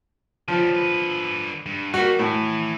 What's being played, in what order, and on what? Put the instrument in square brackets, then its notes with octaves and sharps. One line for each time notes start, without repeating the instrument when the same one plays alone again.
[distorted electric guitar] C#3 G3 [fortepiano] F3
[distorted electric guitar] D3 B4
G2
[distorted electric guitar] G3 [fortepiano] A#3 F#4
[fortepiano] A2 [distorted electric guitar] E4 G#5